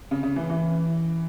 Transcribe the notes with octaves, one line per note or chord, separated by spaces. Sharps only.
C#3
C#3
E3
E3